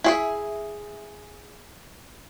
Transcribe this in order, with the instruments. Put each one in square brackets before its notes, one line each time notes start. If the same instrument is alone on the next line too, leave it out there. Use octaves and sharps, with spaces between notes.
[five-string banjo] E4 G#4 E5